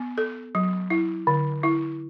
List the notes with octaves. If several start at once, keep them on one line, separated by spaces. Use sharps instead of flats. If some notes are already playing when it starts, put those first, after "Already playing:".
Already playing: B3
A4
F#3
E4
D3
E4